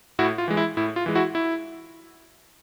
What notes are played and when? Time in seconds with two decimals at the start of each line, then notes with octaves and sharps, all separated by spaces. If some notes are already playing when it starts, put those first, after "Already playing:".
0.19 A2 E4 F#4
0.38 F4
0.48 E3 G#3
0.57 E4
0.77 A2 E4
0.96 F4
1.06 E3 G#3
1.15 E4 F#4
1.35 E4